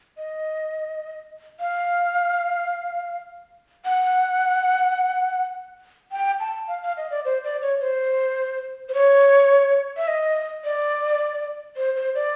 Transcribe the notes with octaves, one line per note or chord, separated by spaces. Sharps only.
D#5
F5
F#5
G5
A5
F5
F5
D#5
D5
C5
D5
C#5
C5
C5
C#5
E5
D#5
D5
C5
C5
D5